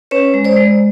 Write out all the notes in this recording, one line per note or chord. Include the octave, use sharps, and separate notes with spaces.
C#4 B4 C#5
G#3
C5 D5
G#3